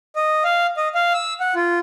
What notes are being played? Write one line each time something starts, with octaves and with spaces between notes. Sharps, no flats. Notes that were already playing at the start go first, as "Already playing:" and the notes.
D#5
F5
D#5
F5
E6
F#5
F4